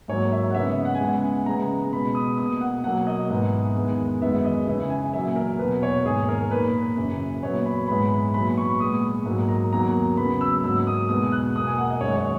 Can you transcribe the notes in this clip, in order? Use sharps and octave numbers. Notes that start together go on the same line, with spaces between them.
G#2 F#3 A#3 C#5
E5
F#5
C#3 G#3 B3 E5
D#5
F#5
G#5
C#3 E3 G#3 B3 F#5
C#3 G#3 B3 A#5
B2 G#3 B3 B5
D#6
B2 A#3 D#6
F#5
B2 F#3 A#3 F#5
D#5
G#2 E3 B3
E2 D#3 G#3 B3
F#2 D#3 G#3 B3 E5
D#5
C#3 E3 B3 E5
G#5
A#2 F#3 A#3 E5
A#4
E2 B2 F#3 B3 B4
C#5
G#2 D#3 A#3 G#4
A#4
A#2 A#3 B4
F#2 C#3 E3 A#3
A#2 F#3 B3 C#5
B5
G#2 E3 G#3 B3 B5
A#2 F#3 B3 B5
B5
C#6
A#2 G#3 B3 D#6
G#2 F#3 A#3
A#5
E2 D#3 F#3 A#3 A#5
C#3 F#3 B3 B5
E6
G#2 F#3 A#3 E6
D#6
E2 B2 G#3 B3 D#6
F#6
B2 A#3 D#6
G#5
F#5
D#5
F#2 D#3 G#3 C#5
C#5